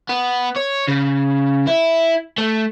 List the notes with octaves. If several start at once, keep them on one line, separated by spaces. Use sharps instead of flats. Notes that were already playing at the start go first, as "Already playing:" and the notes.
B3
C#5
C#3
E4
A3